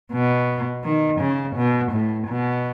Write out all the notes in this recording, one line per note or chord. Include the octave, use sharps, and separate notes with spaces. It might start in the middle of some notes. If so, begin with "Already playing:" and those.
B2
D#3
C#3
B2
A2
B2